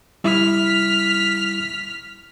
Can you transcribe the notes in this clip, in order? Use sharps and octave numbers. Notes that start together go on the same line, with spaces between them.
G3 E4 F6 B6